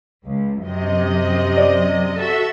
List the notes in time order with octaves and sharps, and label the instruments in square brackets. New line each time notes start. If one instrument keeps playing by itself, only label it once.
[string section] C#2
F#2 C3 D#5
[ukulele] D5
[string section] F#4 A4 E5